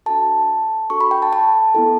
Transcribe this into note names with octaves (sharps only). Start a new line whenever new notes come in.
D4 F#4 A4 A5
D4 F#4 A4 C#6
B5
G5
A5
A5
B3 E4 A4